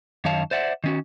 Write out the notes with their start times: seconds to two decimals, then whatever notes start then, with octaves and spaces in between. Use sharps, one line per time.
0.25 F#2 D#3 C#5 F5 A5
0.51 C5 D5 E5 F#5
0.84 D#3 C#4 F#4